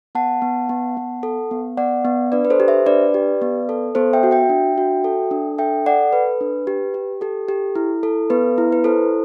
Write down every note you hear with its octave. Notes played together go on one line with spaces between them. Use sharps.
B3 F#5 A5
B3
B3
B3
A4
B3
B3 D5 F#5
B3
D4 B4 D5
B4
A4 C5
G4
C5 E5
D4 B4 D5
G4
B3
A4
B3 A4 C5
E5 G5
F#4
E5 G5
D4
F#4
A4
D4
A4 E5 G5
A4 D5 F#5
A4 B4
D4
G4
G4
G4 A4
G4
E4
A4
B3 B4
E4
B4
E4 A4 C5